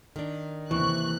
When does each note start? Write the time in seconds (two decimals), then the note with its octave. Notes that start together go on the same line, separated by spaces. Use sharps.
0.16 D#3 D4
0.71 D#2 C3 E3 C#6 F#6